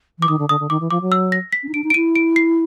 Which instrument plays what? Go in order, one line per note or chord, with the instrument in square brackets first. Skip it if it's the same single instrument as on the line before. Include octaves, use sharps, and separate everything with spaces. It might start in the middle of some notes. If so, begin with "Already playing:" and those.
[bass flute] E3 [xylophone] D6
[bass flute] D#3 [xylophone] D#6
[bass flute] D3
[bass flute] D3 [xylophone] D#6
[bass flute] D3
[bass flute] D#3 [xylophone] D6
[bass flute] E3
[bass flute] F3 [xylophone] D6
[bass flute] F#3
[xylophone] E6
A#6
B6
[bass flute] C#4
D#4
[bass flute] D4 [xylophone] D7
[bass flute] D#4
[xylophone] D7
[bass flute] E4 [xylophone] D#7
[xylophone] D7
C7